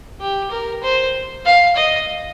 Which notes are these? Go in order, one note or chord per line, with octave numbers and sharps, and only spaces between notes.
G4
A#4
C5
F5
D#5